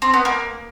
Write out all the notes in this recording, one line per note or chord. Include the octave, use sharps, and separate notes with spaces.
C4
B3
A#3